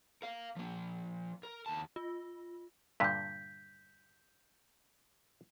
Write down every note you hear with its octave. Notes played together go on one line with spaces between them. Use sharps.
A#4 F5
F3 A#3
A#4
D#2 A5
F4
G2 A#2 D3 G6 B6